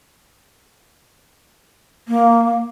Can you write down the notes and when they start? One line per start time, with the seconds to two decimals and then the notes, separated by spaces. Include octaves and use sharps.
2.08 A#3